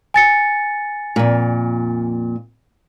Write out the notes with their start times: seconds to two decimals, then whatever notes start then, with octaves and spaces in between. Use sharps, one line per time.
0.14 G#5 A6 C#7
1.16 F2 A#2